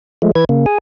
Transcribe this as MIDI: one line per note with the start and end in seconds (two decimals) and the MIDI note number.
0.22 0.31 53
0.22 0.31 56
0.22 0.31 57
0.35 0.45 52
0.35 0.45 71
0.35 0.45 92
0.49 0.66 49
0.49 0.66 58
0.66 0.78 68
0.66 0.78 80